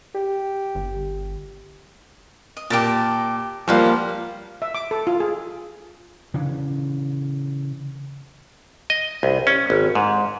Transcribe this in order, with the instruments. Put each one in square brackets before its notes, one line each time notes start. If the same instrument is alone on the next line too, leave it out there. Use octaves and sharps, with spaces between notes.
[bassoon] G4
[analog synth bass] G1
[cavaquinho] D#5
[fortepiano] A#2 [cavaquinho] G4 A#4 A5
[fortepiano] F3 G3 A#3 [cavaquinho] C#5 F5 F#5
[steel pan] E5
D6
A4
F4
G#4
[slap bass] C#3 E3 C#4 D4
[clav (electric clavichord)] D#5
C2
C#4
G#1
G#2